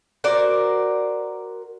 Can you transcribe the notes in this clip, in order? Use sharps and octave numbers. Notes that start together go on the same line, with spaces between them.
F#4 A#4 C5 D5